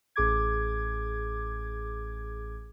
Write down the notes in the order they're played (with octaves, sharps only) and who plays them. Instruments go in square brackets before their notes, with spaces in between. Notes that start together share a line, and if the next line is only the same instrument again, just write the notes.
[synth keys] A1 G#4 D6 G#6